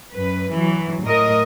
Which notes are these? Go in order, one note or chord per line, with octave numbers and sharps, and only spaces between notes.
F#2 B4
E3 F#3
A2 A#4 D#5